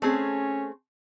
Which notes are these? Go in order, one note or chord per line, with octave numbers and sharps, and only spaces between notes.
A3 C4 C#4 G#4